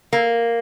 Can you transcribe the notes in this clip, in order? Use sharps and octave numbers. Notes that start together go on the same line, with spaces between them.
A#3